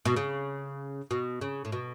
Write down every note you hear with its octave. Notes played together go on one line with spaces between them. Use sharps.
B2
C#3
B2
C#3
A2
B2